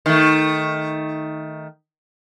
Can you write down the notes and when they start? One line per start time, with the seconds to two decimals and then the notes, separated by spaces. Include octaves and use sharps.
0.06 D#3 A3